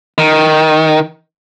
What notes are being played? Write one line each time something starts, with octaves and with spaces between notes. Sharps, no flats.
D#3